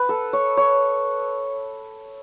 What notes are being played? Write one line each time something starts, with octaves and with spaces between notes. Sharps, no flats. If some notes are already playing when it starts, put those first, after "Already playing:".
Already playing: B4
A4
C#5
C#5